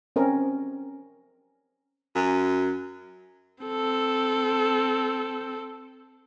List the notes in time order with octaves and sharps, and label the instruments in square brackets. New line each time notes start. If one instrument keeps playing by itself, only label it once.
[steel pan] C4 C#4 A#4
[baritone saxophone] F#2
[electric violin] C4 A4